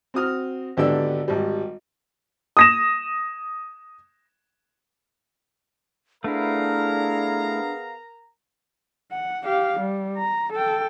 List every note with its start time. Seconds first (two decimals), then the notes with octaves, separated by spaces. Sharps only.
0.14 C4 F#4 D#6 F6
0.77 G#1 D3 B3 G4 D5 E6
1.28 G#1 G3
2.57 D#6 A#6 E7
6.24 A3 B3 D4 E4 G#4 A#4 F5 A#5
9.12 F#5
9.44 G4 F5
9.79 G3
10.17 A#5
10.53 A4 G5